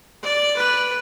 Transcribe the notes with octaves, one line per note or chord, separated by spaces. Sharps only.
D5
B4